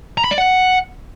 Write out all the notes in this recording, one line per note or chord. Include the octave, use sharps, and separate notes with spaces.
A#5
B5
D5
F#5